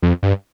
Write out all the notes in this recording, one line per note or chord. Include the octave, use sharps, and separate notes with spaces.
F2
G2